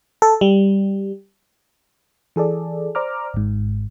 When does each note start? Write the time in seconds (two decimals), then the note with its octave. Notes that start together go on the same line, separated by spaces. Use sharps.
0.22 A4
0.41 G3
2.36 E3 G#4 A4 D5
2.95 C5 D5 A#5 D6 F6
3.34 G#1 G#2